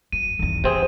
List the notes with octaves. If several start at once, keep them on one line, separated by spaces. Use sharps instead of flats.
F#2 D#7
G#1 E2
C3 E3 C4 G#4